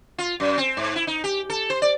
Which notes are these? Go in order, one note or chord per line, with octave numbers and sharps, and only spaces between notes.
F4
F#2
C4
G#2
E4
D#4
G4
A4
C5
D5